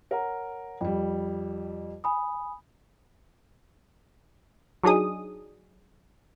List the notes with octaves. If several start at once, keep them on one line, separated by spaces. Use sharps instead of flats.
A#4 C#5 F#5 A#5
F2 G3 G5
G#5 B5 D#6
F#3 D4 D#4 G#4 D#6